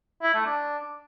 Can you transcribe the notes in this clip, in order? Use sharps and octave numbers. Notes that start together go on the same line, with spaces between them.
E4
A3
D4